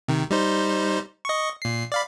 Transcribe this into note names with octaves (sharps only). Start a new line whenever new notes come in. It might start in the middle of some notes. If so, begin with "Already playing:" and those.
C3 D#3
G3 D#4 C5
D#5 C#6
A#2 C7
D5 F5 B5